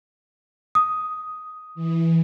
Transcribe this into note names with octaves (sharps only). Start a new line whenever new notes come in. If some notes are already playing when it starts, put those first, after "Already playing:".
D#6
E3